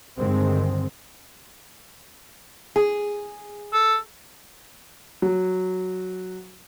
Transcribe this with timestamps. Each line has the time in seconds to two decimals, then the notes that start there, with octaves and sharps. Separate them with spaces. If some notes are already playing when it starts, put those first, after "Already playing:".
0.18 G2 D3 D#3 G#3 C4
2.76 G#4
3.73 A4
5.22 F#3